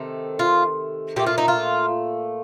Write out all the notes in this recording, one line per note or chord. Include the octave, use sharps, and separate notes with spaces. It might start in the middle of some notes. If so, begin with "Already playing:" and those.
Already playing: C3 D#3 A3
F4
A#2 A3 G4
F4
D#4
F4